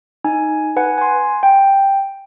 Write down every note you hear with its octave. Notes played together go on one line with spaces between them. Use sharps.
D#4 G#5
B4 F#5 G#5
G#5 C6
G5